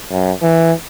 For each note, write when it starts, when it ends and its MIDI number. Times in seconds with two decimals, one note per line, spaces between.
0.11 0.31 42
0.42 0.72 52